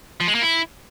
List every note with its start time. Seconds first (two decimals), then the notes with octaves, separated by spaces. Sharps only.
0.20 F3
0.28 G#3
0.35 A#3
0.42 E4